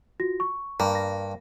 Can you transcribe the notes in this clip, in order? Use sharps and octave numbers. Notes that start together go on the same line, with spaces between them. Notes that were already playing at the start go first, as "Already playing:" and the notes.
F4 F#4 A#6
C#6
G2 A#3
A#6